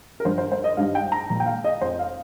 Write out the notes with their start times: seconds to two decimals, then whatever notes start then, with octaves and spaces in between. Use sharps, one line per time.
0.20 A#4
0.25 G2 F3 C5
0.38 C5
0.52 C5
0.64 D#5
0.77 G2 D#3 G3 F5
0.95 G5
1.12 A#5
1.30 A#2 F3
1.40 G5
1.46 F5
1.64 D#5
1.81 F2 F3 C5
1.99 F5